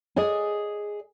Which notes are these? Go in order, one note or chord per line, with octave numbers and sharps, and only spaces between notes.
G#4 D5 D#5 G#5